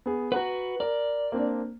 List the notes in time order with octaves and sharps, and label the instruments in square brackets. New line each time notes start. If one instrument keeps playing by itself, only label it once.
[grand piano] B3 G#4
[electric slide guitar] F#4 B4 [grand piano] F#5 A#5 B5
[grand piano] A#4 [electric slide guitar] D5
[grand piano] A#3 C4 D4